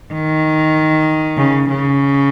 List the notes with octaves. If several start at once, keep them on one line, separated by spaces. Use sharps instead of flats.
D#3
C#3
C#3